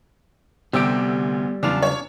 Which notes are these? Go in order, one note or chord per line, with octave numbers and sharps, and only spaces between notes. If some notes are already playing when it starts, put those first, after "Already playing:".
D2 C3 G3 B3 G4 E6 D7
E2 C#3 F#3 D4 F4 E7 F7
C#5